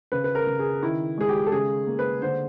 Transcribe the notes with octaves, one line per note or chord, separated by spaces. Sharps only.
C#3 B4
B4
A#4
C#3
G#4
D#3 E4
G#3 G#4
G4
A4
C#3 G#4
A#3
B4
D3 C5